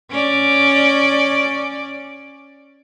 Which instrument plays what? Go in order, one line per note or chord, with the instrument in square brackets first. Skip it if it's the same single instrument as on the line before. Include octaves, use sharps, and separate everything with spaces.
[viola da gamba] C#4 D5